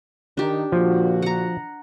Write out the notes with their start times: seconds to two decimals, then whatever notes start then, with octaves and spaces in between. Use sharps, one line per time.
0.37 D#3 D4 G4
0.72 A#2 D3 F3 F#4
1.22 F#5 A#5